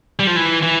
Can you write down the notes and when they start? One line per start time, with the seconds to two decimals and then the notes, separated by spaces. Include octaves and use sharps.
0.19 G3
0.27 F3
0.36 E3
0.63 E3